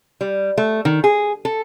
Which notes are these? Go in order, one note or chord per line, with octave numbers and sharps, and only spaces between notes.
G3
A3
D#3
G#4
A4